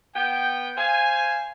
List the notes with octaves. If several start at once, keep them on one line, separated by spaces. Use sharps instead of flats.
B3 G5
C5 F5 G#5